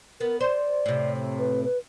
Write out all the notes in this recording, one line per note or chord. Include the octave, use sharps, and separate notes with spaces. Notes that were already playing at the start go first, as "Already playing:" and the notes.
B3 A#4
C5 D5
A2 C3
B4
B4